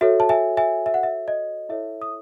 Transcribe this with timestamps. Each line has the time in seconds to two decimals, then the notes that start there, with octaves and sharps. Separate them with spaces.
0.01 F#4 A4 C#5 E5
0.20 A5
0.29 E5 G#5
0.57 E5 G#5
0.86 E5
0.94 F#5
1.03 E5
1.28 D#5
1.69 E4 A4 C#5 E5
2.02 D#6